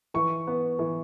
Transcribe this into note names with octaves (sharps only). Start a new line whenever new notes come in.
E3 C#6
B3
E3